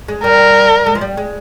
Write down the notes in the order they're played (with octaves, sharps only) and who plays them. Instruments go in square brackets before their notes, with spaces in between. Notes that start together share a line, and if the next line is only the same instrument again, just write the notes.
[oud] G#3
[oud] G3 [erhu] A#4
[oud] G#3
F3
G3
G#3